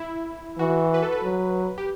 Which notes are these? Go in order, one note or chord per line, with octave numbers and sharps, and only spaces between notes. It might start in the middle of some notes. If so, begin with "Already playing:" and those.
Already playing: E4
E3 F#4
B4
A4
B4
F#3
G4